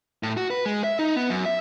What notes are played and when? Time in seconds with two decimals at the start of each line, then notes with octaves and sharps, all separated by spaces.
0.23 A2
0.37 F#4
0.50 B4
0.66 G#3
0.84 E5
0.99 D#4
1.16 B3
1.30 F#2
1.45 E5